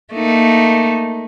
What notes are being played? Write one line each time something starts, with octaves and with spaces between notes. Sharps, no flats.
A3 A#3 D#4